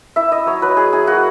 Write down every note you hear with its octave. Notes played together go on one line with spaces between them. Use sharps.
E4 E5
E4 D#5
F#3 C#5
F#3 B4
E4 G#4
E4 G#4
A#3 F#4